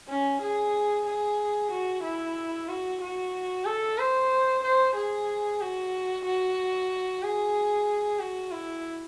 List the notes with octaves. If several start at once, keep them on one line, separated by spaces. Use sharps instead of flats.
C#4
G#4
G#4
F#4
E4
F#4
F#4
A4
C5
C5
G#4
F#4
F#4
G#4
F#4
E4